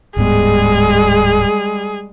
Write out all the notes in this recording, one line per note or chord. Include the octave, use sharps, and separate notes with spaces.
D1 G#2 G3 G#3 B3 G#4